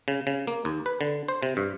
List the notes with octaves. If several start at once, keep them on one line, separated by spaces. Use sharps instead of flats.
C#3
C#3
A#3
D#2
B4
D3
C5
C3
G2